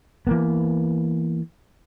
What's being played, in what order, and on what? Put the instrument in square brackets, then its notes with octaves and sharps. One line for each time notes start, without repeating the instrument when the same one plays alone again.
[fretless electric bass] E3 A#3 B3